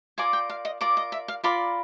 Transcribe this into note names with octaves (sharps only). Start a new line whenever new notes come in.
F4 A#4 D5 G#5
G5
F5
D#5
F4 A#4 D5
D#5
E5
F5
F4 A#4 D5 B5